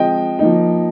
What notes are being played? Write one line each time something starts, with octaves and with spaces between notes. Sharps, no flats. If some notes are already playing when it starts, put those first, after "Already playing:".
Already playing: F3 G#3 C4 D#5 G5
F3 A#3 D#4